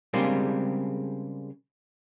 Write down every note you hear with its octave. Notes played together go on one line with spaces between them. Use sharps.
C#3 G3 G#3 A#3 C4 D4